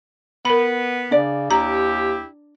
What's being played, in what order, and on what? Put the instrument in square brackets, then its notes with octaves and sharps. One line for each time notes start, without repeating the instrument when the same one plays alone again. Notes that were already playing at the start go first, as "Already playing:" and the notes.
[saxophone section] B3 [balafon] A#4 B5
[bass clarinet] C#3 [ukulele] D4 D5
[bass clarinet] D#2 [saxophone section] E4 G4 [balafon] A#5